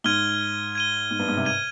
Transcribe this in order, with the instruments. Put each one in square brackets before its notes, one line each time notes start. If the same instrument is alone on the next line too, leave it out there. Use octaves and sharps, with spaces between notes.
[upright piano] G#2 [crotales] F6 G#6 D#7 G7
[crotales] G#6 D#7 G7
[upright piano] G#2
G2
G#2
C3
[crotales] G#6 D#7 G7